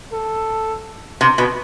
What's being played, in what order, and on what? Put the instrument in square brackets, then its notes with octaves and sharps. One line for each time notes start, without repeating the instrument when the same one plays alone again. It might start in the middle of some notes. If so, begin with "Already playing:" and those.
[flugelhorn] A4
[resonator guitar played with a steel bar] C3
B2